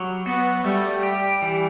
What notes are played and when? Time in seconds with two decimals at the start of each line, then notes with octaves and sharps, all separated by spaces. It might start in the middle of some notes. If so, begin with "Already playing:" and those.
Already playing: F#3 G3
0.26 B3 F#4
0.64 G3 A3
1.03 G4
1.42 E3